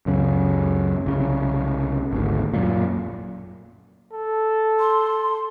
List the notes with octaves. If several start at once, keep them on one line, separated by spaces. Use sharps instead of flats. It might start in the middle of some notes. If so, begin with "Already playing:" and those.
C#2 F#2 C#3
C2 C#3
G#1 D2
F#2 A#2
A4
C6